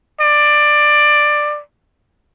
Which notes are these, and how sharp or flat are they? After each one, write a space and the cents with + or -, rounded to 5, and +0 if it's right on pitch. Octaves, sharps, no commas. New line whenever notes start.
D5 +15